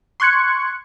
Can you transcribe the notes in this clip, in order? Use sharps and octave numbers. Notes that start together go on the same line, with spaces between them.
C6 C#6 F#6 G#6 C#7